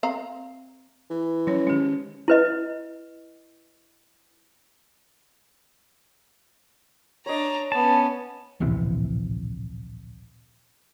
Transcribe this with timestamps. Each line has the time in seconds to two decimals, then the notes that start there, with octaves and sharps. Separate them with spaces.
0.03 C4 F5 A#5
1.10 E3
1.47 F#3 C#4 C#5
1.67 D#3 G#3 C#4 G4
2.28 E4 B4 D#5
7.26 D4 C#5 D#5 A#5
7.72 B3 C#4 A5
8.60 D1 A#1 C3 E3